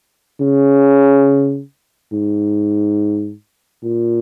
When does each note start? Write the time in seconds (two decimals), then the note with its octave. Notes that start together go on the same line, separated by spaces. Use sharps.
0.41 C#3
2.13 G#2
3.84 A#2